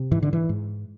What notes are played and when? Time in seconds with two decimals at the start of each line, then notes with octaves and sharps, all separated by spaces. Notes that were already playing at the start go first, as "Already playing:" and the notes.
Already playing: C3
0.11 G#2 E3
0.22 D3
0.33 E3
0.49 G#2